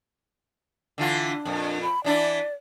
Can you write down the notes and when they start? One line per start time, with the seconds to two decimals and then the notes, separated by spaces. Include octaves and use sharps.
0.98 D3 E3 F4
1.28 D4
1.45 F2 A#2
1.82 B5
2.04 E3 D4 E4 D5